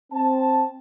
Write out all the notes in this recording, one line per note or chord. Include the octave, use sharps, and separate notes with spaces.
C4 A5